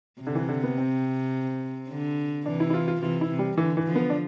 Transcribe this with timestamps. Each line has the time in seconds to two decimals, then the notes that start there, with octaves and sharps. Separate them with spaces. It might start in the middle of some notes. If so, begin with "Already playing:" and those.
0.21 C3
0.27 D3
0.35 E3
0.49 D3
0.63 B3
0.78 C4
1.89 D3
2.46 C3 E3 D4
2.60 E4
2.70 E4
2.74 F4
2.88 F4
3.01 C3 E3 F4
3.21 E4
3.30 C3
3.39 G3
3.58 D3 E3
3.77 E3
3.86 D3 F3
3.95 B3
4.10 D4